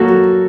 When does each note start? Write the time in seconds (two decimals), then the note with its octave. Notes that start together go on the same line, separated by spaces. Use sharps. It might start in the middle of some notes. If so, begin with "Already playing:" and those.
Already playing: F#3 A#3 F#4 A4